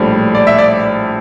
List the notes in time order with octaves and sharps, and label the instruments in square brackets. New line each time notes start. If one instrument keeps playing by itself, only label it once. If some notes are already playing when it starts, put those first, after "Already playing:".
Already playing: [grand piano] A#1 A2 G3
D5
E5
D5